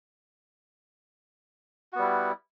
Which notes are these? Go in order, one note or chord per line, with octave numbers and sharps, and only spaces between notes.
G3 B3 E4 F#4